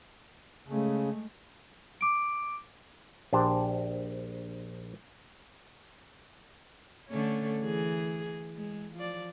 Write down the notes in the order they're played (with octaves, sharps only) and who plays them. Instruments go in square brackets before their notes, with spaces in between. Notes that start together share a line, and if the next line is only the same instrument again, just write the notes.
[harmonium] C#3 [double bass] G#3 A3
[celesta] D6 D7
[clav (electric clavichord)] A#1 D4 G4 C5
[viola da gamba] D3 A3 C#4
E3 G#4
G#3
F3 D5